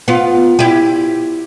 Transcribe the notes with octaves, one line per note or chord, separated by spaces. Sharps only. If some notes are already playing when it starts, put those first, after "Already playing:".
B3 F4
E4 G4